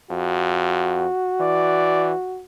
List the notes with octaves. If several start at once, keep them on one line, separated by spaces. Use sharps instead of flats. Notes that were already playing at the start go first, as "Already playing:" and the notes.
F2 F#4
E3 D5